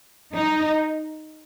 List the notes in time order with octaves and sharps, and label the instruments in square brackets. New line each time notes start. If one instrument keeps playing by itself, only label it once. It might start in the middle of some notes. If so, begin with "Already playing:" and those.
[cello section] D#4